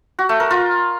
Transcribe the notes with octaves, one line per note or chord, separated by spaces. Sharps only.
F#4
A3
A#4
F4